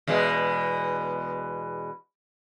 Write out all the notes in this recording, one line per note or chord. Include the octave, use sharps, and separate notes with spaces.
E2 B2 G#3